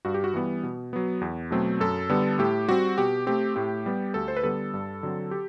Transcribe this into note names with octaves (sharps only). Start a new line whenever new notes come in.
G2 F#4
G4
F#4
E3 G3 B3
B2
F#3 B3
E2
B2 F#3 A3 C4
F#2 A4
D3 G3 B3
A2 G4
G3 C4 F#4
B2 G4
A3 C4 G4
A2 G4
G3 B3
D2 A4
C5
B4
D3 G3 B3 A4
G2
D3 F#3 C4
G4